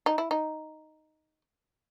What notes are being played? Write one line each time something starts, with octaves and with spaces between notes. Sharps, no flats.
D#4
E4
D#4